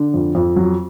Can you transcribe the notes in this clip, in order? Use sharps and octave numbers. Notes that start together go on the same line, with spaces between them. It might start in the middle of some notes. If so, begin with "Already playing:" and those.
Already playing: D3
F2
F2
F#3